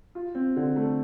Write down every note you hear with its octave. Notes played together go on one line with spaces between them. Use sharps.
F4
C4
D3
A3